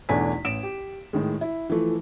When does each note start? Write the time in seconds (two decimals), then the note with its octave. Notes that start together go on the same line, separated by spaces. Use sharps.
0.09 B1 E2 A3 D4 G#5 B6
0.45 A1 D7 E7
0.63 G4
1.13 A2 D#3 G#3
1.41 E4
1.70 E3 F3 A3